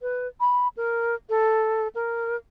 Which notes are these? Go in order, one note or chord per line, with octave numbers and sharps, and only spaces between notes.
B4
B5
A#4
A4
A#4